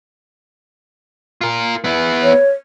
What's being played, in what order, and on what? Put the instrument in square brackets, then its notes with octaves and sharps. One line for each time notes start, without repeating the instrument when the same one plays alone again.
[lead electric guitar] F4 A#4
B3 E4
[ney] C#5